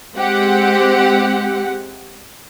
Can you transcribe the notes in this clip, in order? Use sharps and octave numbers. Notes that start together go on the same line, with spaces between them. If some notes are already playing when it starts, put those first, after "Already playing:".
G#3 C4 G4 F#5